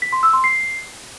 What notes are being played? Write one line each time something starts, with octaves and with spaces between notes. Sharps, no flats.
B6
C6
E6
C6
C7